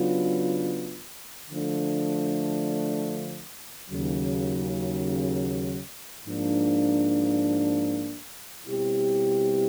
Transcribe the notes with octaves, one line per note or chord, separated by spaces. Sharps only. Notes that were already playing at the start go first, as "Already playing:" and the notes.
Already playing: C#3 F#3 B3 D4 F4
D3 F3 A3 D4
D#2 C#3 F#3
G#2 F3 A#3 D4
B2 G3 C4 E4 G4